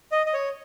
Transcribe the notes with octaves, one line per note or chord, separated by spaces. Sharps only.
D#5
D#5
C#5